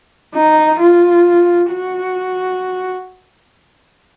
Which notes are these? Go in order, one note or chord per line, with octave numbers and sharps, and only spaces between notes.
D#4
F4
F#4